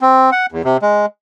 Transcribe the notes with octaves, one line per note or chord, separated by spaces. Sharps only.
C4
F#5
E2
C3
G#3